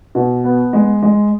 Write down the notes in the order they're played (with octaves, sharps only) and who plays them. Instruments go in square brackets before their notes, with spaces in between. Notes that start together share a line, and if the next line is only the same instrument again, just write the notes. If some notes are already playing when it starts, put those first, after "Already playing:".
[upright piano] B2
B3
G#3
G#3